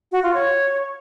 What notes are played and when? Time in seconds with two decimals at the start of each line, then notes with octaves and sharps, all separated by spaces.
0.12 F#4
0.23 F4
0.34 C#5